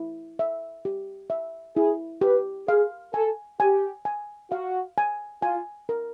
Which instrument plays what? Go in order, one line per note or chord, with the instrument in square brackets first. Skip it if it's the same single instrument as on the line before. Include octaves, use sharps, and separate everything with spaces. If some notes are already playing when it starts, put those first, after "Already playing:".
Already playing: [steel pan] E4
E5
G4
E5
[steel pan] E4 [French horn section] G#4
[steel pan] G4 [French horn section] B4
[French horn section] G#4 [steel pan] F5
[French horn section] A4 [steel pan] G#5
[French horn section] G4 [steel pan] G#5
[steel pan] G#5
[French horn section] F#4 [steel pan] F5
[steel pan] G#5
[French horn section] F4 [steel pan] G#5
[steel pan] A#4